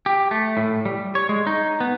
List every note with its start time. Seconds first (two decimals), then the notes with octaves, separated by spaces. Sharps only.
0.06 G4
0.31 A3
0.57 A2
0.85 G3
1.15 C#5
1.29 G#3
1.47 D#4
1.80 B3